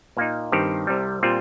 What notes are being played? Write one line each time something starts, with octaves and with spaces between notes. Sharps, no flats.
A#2 A#3 D#4
G2 D#3 C4 G4
C2 C3 G3
A#2 G3 C4 F4